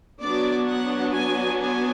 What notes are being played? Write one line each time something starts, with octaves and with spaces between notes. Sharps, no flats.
F#3 B3 D4 D5
F#5
G#5
G#5